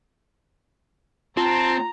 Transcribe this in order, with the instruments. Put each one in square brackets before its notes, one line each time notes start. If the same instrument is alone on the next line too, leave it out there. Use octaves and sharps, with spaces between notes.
[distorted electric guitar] C4 [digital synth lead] F4 [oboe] A5 [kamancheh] A#5